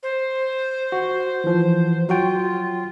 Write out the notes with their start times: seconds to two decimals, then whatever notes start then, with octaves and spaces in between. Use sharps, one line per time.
0.03 C5
0.92 F#4
1.44 E3 F3
2.09 F#3 F4 F#4 G5